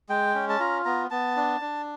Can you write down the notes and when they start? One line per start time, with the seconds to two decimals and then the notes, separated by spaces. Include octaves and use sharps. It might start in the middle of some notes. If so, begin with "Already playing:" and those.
0.09 G#3 G5
0.35 C#4
0.49 A5
0.60 F4 A#5
0.85 B3 A#5
1.11 B3 A5
1.36 D4
1.61 D4